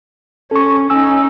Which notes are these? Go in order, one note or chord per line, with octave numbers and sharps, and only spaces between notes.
C#4 A4 C#6
C#4 D#4 G#5 E6